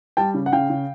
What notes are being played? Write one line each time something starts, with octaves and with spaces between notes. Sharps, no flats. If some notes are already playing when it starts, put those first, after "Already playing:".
G3 G5 A5
C#3
F#5
C#3 F5 G5
C#3